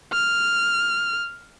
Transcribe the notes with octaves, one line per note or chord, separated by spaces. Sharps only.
F6